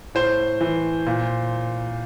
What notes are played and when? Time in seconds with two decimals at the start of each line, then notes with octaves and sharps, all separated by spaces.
0.15 A2 C5
0.61 E3
1.07 A#2